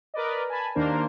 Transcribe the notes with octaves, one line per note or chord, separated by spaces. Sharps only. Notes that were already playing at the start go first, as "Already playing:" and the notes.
A#4 B4 D5 D#5
G#5 A5 B5
D#2 D#3 A#3 D4 A#4 C5